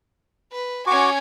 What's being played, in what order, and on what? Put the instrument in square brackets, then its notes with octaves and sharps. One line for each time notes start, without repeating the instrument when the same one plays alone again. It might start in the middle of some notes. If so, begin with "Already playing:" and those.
[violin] B4
[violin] C#4 G#5 [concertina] F#4 C#6 D6